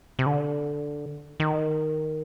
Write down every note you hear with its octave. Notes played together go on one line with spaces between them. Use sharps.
C3
D3
D#3